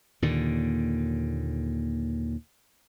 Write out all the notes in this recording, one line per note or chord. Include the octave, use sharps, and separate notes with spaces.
D#2 A#2 D3